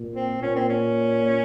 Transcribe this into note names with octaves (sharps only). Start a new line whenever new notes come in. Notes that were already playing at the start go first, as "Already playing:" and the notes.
Already playing: A#2
C4
A#2 C#4
C4
C#4